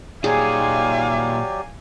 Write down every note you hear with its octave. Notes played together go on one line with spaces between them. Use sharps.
A#2 F#3 D#4 G4 G#4 D5 F5 G#5